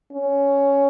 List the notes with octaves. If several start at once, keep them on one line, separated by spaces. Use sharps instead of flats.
C#4